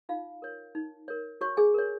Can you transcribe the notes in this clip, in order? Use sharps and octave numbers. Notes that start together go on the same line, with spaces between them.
D#4 F4 F5
A#4 C#5
D#4
A#4 C#5
F#4 C#5 C#6
G#4 G#5
A#4 C#5